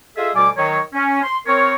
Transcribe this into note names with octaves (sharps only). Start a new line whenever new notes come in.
F4 G#4 A4 D#5 E5
D2 B2 G3 G#5 D6
D#3 F#3 C#5
C#4
C6
C4 A#4 C#5